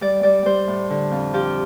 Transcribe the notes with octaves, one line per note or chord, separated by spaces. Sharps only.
G3 D5
G3 D5
G3 C5
A2
D3
F2
F3 G4